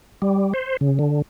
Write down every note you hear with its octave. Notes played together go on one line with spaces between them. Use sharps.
G3
C5
C#3
D3